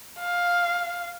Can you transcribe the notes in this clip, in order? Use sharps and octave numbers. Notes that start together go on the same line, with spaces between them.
F5